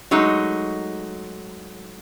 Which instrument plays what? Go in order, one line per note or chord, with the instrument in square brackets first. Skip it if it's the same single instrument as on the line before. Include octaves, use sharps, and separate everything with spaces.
[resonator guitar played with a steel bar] F#3 G#3 A3 D#4